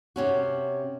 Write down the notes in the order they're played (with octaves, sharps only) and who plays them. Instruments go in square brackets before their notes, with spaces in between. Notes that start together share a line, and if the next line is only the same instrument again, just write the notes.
[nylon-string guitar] C3 C#4 F#4